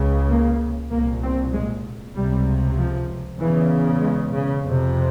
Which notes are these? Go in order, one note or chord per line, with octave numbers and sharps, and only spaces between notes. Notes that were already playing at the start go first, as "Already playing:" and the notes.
Already playing: C#2 C#3
A#3
C2 A#2 A#3
C4
G#3
C#2 C3 G3
F3
E2 C#3 E3
G#3
C#3
F2 C3